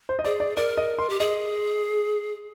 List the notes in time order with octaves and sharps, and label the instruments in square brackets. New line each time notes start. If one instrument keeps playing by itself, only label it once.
[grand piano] C5
D#5
[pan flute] G#4 [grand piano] D5
[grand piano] D5
[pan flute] A#4 [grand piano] D5
[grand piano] D#5
C6
[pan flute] G4
[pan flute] G#4 [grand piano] D#5